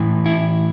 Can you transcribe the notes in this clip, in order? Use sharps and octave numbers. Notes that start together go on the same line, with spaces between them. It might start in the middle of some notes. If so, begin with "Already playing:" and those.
Already playing: A2 E3
E4